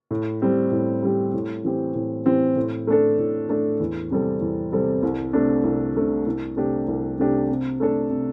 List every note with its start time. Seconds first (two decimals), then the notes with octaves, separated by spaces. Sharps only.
0.11 A2
0.41 G3 C4 G4
0.71 A2
1.03 G3 C4 G4
1.34 A2
1.64 E3 C4 G4
1.95 A2
2.26 E3 C4 G4
2.56 A2
2.87 A3 D4 A4
3.18 A2
3.49 A3 D4 A4
3.80 E2
4.11 C3 G3 C4 A4
4.41 E2
4.72 C3 G3 C4 A4
5.03 C2
5.33 C3 A3 D4
5.64 C2
5.95 C3 A3 D4
6.26 C2
6.56 C3 A3 D4 G4
6.88 C2
7.19 C3 A3 D4 G4
7.50 C3
7.80 A3 D4 A4
8.10 C3